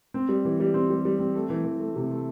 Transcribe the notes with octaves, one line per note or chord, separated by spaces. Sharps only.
C4
G3
E3
G3
C4
G3
G3
C4
A3
E3
E3
A3
C3
A3